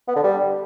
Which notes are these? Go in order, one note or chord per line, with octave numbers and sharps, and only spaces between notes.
B3
D3
G3